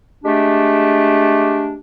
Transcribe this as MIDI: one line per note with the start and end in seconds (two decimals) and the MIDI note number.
0.24 1.78 56
0.24 1.78 57
0.24 1.78 62
0.24 1.78 67